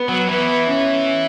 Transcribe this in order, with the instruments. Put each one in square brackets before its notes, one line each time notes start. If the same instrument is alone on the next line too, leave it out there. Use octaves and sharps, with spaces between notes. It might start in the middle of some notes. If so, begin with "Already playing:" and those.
Already playing: [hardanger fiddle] B3
[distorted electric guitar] F#3
[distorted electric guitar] E3 [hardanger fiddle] B3
[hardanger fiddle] C#4